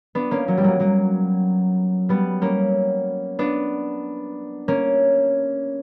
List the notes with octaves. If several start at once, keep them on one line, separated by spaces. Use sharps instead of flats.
B3 D4
A#3 C#4
F#3 A#3
G3
F#3 A#3
F#3 A#3
G3 B3
A#3 C#4
B3 D4
A#3 C#4